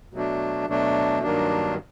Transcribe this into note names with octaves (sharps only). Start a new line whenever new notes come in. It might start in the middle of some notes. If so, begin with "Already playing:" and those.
B2 F#3 A3 D4
B2 F#3 A3 D4
G2 D#3 F#3 A#3 D4